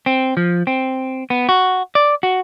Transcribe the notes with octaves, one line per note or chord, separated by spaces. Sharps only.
C4
F3
C4
B3
F#4
D5
F#4